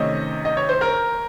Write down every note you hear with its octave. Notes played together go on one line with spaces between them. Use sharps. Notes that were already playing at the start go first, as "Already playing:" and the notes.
Already playing: C3 D#3 A3 C#4 D#5
D#5
C#5
C5
A#4